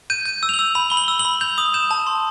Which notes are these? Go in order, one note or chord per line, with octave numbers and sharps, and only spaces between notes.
G6 D#7
G6
E6
F7
F#7
E6
B5 F7
B5 G7
F#7
E6
F#7
B5
G6 F7
D#6
G6 E7
A5
C6